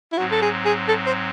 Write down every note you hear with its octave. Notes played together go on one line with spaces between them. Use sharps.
E4
G#2 F#3 C4 F#4
A4
G#4
G#4
A4
C5